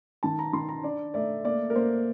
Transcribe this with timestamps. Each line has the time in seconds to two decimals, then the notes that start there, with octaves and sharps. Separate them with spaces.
0.23 D#3 A5
0.39 A#5
0.53 D#3 C6
0.69 A#5
0.84 D4 D5
1.14 A3 D5
1.45 A#3 D5
1.70 A#4
1.75 A#3 C5